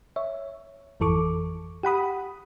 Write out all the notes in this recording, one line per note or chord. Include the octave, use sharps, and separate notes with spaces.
C#5 E5
G#1 F2 E3 A4 C#6 D6
G4 F#5 B5 D#6